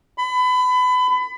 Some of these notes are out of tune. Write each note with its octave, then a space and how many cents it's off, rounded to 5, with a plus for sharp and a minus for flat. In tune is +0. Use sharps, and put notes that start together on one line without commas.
B5 +30